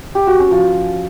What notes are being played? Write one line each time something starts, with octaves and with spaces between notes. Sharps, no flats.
G4
F#4
C#4
F3